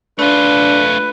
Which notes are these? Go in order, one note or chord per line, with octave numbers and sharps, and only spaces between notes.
A3 D4 F4 B4